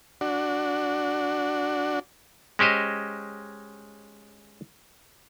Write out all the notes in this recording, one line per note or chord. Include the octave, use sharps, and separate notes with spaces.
D4 F#4
G#3 C#4 G4 C5 D#5